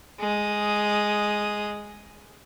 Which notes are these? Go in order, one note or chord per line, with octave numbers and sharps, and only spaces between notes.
G#3 D#6